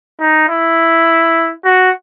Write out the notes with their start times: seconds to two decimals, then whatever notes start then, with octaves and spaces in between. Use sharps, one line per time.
0.20 D#4
0.49 E4
1.65 F#4